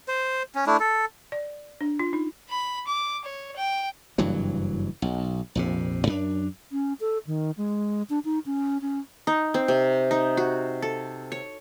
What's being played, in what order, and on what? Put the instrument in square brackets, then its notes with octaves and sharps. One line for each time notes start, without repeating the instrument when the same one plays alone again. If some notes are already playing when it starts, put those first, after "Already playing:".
[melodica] C5
C#4
A3 D4 E4
A4
[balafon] D5
D4
F4
D#4
[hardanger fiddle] B5
D6
C#5
G5
[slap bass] F#1 G2 E3 F#3
B1
A#1 F2 C3
F#2 D4
[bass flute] C#4
A4
D#3
G#3
D4
D#4
C#4
C#4
[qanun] D#4
C4
C3
D#4
F#4
A4
C#5